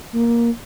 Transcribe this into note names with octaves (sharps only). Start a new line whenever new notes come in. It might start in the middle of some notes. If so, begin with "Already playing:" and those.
A#3